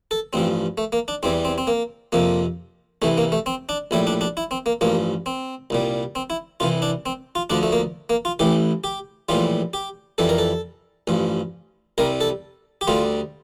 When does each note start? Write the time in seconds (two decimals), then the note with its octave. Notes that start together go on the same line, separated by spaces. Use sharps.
0.11 A4
0.33 A1 G2 F3 C4
0.78 A3
0.92 A#3
1.08 D4
1.23 E2 E3 G3 C4
1.45 C4
1.58 C4
1.67 A#3
2.12 F2 C3 F3 A#3
3.02 C2 C3 E3 A3
3.18 A#3
3.32 A3
3.46 C4
3.69 D4
3.91 A#1 A2 G3 E4
4.07 D4
4.21 D4
4.37 E4
4.51 C4
4.66 A#3
4.81 A1 G2 F3 A#3
5.26 C4
5.70 C2 A#2 G3
6.15 C4
6.30 E4
6.60 C2 C3 E3 F4
6.82 D4
7.06 C4
7.35 F4
7.50 D2 D3 F3 D4
7.63 A3
7.72 A#3
8.10 A#3
8.25 F4
8.39 A1 A2 E3 G4
8.84 G4
9.29 A#1 A2 E3 G3 F4
9.73 G4
10.18 F2 E3 G3 A4
10.29 A#4
10.38 A4
11.07 A1 G2 F3
11.98 C2 C3 G3 A#4
12.21 A4
12.81 G4
12.87 D2 D3 G3 F4